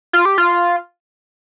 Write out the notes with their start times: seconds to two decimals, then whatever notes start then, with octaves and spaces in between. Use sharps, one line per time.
0.13 F4
0.25 G4
0.38 F4